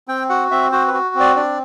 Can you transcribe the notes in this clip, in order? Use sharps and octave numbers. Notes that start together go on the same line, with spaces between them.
C4 G5
F#4 F#5
C4 E5
F#4 C5
B4
F#4
C4
D5
D4 D5